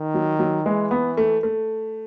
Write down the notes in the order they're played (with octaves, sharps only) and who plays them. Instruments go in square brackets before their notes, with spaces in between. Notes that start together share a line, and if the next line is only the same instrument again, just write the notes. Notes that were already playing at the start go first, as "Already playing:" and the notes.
Already playing: [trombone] D#3
[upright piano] F#3
F#3
[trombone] E3 [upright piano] G#3
[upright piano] B3
A3
A3